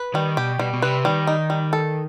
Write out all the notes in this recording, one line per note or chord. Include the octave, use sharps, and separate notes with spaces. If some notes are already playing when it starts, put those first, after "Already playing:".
Already playing: B4
D#3 G3
B2 G4
B2 G3
B2
C3 B4
D#3 G3
D#4
G3
A4